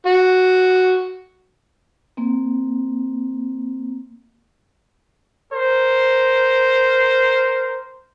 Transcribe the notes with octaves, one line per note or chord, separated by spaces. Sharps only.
F#4
A#3 C4
A#4 C5